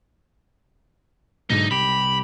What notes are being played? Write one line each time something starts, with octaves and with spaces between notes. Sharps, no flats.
B1 G#2 D3 D#4
C2 G4 B5